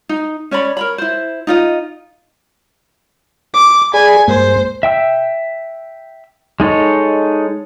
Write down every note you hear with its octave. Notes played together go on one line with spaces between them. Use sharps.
D#4
C#4 C#5 D5 B5
A#4 C#5 B5
E4 C5
D#4 F4 D#5
D6
G#4 D5 G#5 B5
G2 G#3 A#3 C5
E5 G5 E6
G#3 D#4 A4 C#5